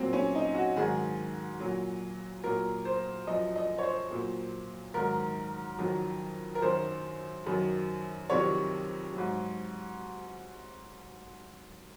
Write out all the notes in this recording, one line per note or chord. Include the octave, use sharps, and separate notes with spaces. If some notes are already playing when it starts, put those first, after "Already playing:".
Already playing: A#2 F#3 C4
C#4
D#4
F#4
G#2 D#3 F#3 G#4
A#2 F#3
A#2 F#3 A#4
C5
F#2 F3 D#5
D#5
C#5
C5
A#2 F#3
G#2 D#3 F#3 A#4
F2 D#3 F#3
A#4
F#2 D#3 F#3 C5
F#2 D#3 F#3
F2 C3 D#3 F#3 C#5
G#2 F#3